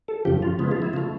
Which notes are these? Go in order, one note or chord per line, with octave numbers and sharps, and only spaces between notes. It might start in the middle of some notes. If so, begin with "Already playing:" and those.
A4
F#2 C#3 F3 G4
F4
C#3 F3 G#3 B3
F4
E4
C#3 F3 A3 F4